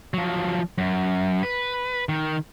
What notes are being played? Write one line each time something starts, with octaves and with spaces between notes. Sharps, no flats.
F3 F#3
F#2
B4
D#3